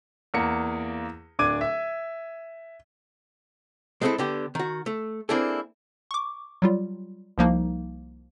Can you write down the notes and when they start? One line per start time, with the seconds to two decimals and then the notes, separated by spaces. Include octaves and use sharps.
0.34 E2 A#3 C#7
1.39 D1 D4 D6 G#6 D#7
1.61 E5
4.01 G#3 A3 C4 C#4 E4 A4
4.18 D3 B3 G4
4.55 D#3 F#4
4.86 A3
5.29 A#3 C4 D4 E4 G#4 A4
6.11 C#6 D6
6.62 F#3 G3 F4
7.38 C2 F3 A#3 D#4